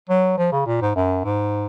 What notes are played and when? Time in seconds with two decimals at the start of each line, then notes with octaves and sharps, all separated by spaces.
0.09 F#3
0.38 F3
0.52 C#3
0.67 A#2
0.82 G#2
0.96 F#2
1.24 G#2